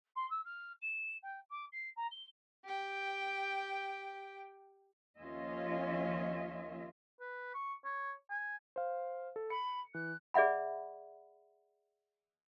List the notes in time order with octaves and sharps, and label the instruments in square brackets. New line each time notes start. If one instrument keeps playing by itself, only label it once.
[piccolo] C6
E6
F6
E7
G5
D6
C7
A#5
G7
[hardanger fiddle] G4 G5
[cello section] D#2 F3 C#4 F4 D#5 E5
[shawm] B4
C#6
C#5
G#5
[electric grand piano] C5 F5
A4
[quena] B5 [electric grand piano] C#7
[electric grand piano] E3 [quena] F#6
[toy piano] G#4 D5 E5 F#5 B5